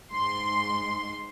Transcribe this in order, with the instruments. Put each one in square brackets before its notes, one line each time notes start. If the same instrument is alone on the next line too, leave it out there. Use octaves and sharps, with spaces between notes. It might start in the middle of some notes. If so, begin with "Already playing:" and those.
[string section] G#2 C6